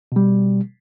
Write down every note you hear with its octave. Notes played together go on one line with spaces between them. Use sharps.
B2 G3